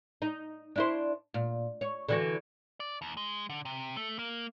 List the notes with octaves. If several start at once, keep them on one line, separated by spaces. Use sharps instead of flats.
D#4
D4 E4 C5
A#2
C#5
D3 E3 F#4
D5
D#2
G#3
D3
C3
A3
A#3